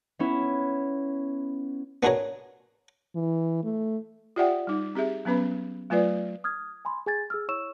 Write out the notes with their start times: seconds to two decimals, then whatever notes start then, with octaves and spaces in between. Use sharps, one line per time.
0.19 B3 C#4 E4
2.03 B3 D4 F#4 G#4 A#4 C#5
3.15 E3
3.64 A3
4.36 F4 G4 D5 E5 F#5 G5
4.67 G3 D#4
4.95 C4 G4 G#4 E5
5.25 F#3 B3 C#4 B4 B5
5.90 F#3 A3 F4 B4 D5
6.44 D#6 F6 G#6
6.85 G#5 B5 C6
7.06 G#4 G#5 G#6 A6
7.30 G#4 E6 F6
7.48 E4 C#5 C#6 E6 E7